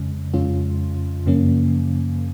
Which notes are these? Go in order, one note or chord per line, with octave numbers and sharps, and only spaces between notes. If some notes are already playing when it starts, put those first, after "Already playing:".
Already playing: F2 C#3 G#3 C#4
F2 C#3 G#3 C#4 F4
F#2 C#3 F3 A#3 C#4